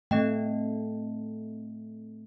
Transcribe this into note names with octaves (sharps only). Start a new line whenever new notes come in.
A3 C4 D#5 G5